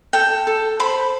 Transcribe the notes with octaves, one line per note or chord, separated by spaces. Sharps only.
A4 G5
A4
C5 B5